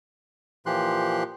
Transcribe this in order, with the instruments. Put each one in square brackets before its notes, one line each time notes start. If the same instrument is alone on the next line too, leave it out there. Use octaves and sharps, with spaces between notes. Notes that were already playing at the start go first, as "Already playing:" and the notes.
[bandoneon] A#2 E3 F3 G4 C6 F#6